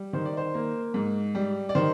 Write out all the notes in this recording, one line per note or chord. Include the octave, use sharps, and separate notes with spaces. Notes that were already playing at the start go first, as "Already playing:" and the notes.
Already playing: G3
D#3 C5
D5
C5
A#3
G#2
G3
D5
D#3 C5